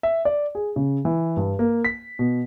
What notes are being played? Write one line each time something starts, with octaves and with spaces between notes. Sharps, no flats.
E5
D5
G#4
C#3
E3
G2
A#3
B6
B2